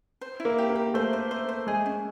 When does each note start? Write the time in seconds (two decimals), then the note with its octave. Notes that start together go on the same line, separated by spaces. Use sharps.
0.21 C5
0.40 E4
0.45 A#3
0.58 G4
0.70 A#3
0.75 G4
0.94 A3 C5
1.13 C5
1.31 C5
1.49 C5
1.67 G#3 G#4
1.86 C#4